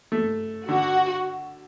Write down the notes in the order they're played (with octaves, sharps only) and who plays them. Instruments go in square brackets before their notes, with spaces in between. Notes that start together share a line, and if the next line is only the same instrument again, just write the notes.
[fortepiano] A3
[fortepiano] D3 [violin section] F#4